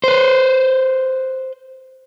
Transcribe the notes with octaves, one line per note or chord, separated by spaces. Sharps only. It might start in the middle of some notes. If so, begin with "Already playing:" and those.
B4 C5